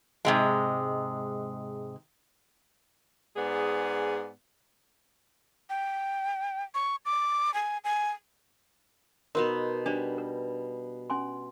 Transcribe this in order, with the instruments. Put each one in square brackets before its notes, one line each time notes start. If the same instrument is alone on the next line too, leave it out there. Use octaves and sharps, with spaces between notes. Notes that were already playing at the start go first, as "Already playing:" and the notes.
[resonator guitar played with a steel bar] G#2 C3 G#3
[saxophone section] G#2 B3 G#4 D5
[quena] G5
C#6
D6
G#5
G#5
[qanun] B2 B3 D#4 [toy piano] A#4 C5 C6
[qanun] G3 [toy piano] D4 C5
[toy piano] B4
C#4 G#5 C6